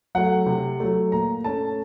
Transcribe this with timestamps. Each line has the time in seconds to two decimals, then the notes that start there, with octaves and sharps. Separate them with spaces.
0.15 F#3 A3 F#5
0.46 C3
0.80 F#3 A3
1.12 A#2 A#5
1.44 A3 C#4 A5